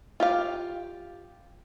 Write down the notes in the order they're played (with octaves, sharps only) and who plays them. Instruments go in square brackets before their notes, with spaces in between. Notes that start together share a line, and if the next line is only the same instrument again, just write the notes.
[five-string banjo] F4 G4 F5